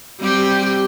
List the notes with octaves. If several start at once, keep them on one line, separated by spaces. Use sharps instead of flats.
G3 C4 G4